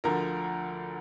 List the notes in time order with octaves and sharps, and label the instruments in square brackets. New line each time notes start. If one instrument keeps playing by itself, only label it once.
[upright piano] D2 D3 F3 A#4 A#5